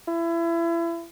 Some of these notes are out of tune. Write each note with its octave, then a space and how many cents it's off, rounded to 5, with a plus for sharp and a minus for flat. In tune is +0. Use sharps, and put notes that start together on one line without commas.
E4 +30